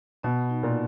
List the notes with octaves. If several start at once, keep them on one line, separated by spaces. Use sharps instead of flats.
B2 B3
D#4
A#2